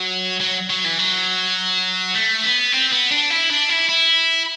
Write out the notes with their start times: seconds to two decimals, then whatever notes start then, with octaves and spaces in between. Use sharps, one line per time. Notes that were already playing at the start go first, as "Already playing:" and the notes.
Already playing: F#3
0.41 F#3
0.70 F#3
0.84 E3
0.99 F#3
2.15 A3
2.44 B3
2.72 C4
2.92 B3
3.11 D4
3.30 E4
3.50 D4
3.69 E4
3.89 E4